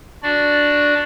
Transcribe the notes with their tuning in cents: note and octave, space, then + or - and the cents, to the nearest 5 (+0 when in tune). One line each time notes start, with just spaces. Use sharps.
D4 +0 F#4 -5 D5 +0